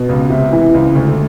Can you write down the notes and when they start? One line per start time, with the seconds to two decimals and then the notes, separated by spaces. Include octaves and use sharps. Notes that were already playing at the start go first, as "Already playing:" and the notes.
Already playing: B2
0.09 C#2
0.30 C3
0.52 E3
0.74 C#2
0.95 D2